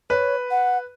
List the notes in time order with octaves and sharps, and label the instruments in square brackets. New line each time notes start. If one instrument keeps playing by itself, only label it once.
[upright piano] B4 [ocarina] C#5
[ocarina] F#5